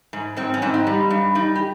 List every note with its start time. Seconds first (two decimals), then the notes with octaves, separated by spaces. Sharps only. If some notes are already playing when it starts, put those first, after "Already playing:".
0.13 G#2
0.37 G#2 C4
0.54 C#4
0.62 G#2 C4
0.74 D#4
0.87 G3
1.10 G2
1.35 G3 D#4
1.56 G4